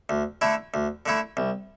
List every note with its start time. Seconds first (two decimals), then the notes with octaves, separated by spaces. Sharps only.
0.09 D2
0.41 D3 A3 E4
0.74 D2
1.06 D3 A3 E4
1.37 C2